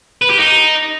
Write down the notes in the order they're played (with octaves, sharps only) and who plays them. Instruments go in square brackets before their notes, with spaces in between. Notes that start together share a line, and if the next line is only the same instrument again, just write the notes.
[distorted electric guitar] B4
G4
D#4